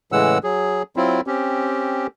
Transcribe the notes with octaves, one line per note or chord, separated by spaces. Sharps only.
A2 C#3 E3 G#3 F#5 E6
F#3 G#4
F#3 C4 E4 F4
C4 C#4 G4